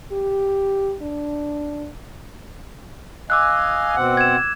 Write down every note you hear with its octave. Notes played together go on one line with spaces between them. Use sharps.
G4
D4
D#5 F5 G#5 D6 E6 F#6
B2 C4 F#5
G#6 E7